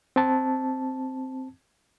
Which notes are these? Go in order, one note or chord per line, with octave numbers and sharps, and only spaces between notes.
C4 A5